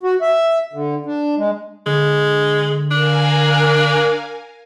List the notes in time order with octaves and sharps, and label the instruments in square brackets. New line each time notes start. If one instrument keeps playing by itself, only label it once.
[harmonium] F#4
E5
D3
D4
G#3
[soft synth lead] D3 [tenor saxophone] G#3
[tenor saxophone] D4 [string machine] A#4 F5 G#5